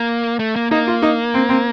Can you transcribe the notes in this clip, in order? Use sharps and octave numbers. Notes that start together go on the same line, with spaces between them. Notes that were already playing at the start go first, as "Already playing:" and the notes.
Already playing: A#3
A3
A#3
A#3 D#4
F4
D#4
C4
C4